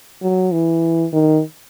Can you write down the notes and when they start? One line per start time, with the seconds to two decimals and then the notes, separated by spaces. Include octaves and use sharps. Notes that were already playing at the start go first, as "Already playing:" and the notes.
0.22 F#3
0.52 E3
1.13 D#3